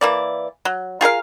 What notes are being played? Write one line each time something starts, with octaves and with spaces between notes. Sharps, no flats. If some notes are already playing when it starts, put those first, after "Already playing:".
E3 A#3 D5
F#3
F4 G#4 A#4 F5